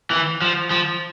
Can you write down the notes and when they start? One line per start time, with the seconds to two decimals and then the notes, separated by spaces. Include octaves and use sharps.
0.11 E3
0.42 F3
0.71 F3